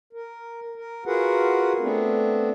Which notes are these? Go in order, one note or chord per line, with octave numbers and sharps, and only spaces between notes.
A#4
A#4
F4 F#4 G#4 A#4 B4 F#5
A3 B3 C4 D4